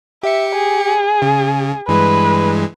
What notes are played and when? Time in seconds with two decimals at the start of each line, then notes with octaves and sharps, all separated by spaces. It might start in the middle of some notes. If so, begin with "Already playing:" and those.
0.23 G4 E5 C#7
0.55 G#4
1.22 C#3
1.88 G2 E3 G#3 B4